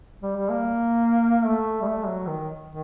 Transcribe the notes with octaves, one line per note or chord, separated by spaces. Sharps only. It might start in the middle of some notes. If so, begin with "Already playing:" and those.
G3
G3
A#3
A3
G3
A3
F#3
D#3
D#3